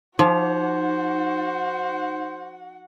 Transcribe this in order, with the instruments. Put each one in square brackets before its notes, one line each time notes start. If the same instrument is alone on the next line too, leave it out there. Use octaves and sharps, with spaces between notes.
[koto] F3 [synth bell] D#4 [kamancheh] F#4 F#5 [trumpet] C5